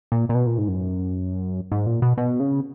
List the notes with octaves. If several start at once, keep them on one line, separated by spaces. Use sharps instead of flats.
A#2
A#2
B2
A#2
G#2
F#2
G#2
A#2
B2
B2
C#3